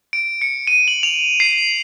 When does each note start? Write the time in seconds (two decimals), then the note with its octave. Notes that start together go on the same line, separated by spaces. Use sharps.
0.13 D7
0.41 C#7
0.67 D#7
0.88 F#7
1.03 F7
1.40 C7